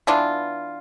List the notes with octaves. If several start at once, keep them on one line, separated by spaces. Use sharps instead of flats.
E3 B3 D4 F4